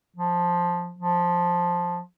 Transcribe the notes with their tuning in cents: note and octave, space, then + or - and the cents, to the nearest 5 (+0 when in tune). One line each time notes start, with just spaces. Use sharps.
F3 +5
F3 +5